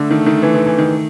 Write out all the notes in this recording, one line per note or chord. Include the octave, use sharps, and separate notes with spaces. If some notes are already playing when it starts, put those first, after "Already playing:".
Already playing: D3 A3
D#3
D#3
E3
E3
E3
D#3